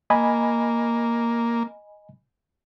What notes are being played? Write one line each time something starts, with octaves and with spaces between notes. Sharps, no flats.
A#3 D#5 G#5 B5